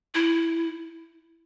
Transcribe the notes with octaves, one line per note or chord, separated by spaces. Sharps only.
E4